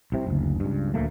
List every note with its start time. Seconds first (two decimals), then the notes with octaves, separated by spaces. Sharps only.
0.12 C2 C3
0.27 F#1 D2
0.60 C#2 G2
0.94 D#1 D2 A3 A#3